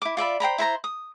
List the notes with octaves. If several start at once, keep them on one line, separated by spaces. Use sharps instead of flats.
E4 D6
F4 D5 E5 B5
C5 G5 A#5 B5
E4 C5 A#5 C6
D#6